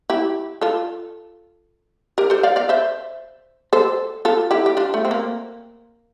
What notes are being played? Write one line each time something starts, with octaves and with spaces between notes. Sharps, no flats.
E4 G4
F4 A4
G4 A#4
A4 C5
D5 F5
D5 F5
C5 E5
A4 C5
F4 A4
E4 G4
G4
D4 F4
A3
C4
A#3